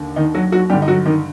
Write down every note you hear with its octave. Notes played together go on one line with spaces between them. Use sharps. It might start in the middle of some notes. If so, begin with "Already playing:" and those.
Already playing: D#2 D3
D#3 D#4
F#3 F#4
F#3 F#4
G2 D3 G3 G4
D#4
F#3 F#4
D#3 D#4